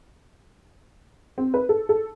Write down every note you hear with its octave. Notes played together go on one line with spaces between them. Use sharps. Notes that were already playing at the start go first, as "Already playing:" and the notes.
C4
B4
A4
A4